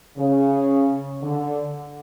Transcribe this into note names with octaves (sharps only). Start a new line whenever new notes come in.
C#3
D3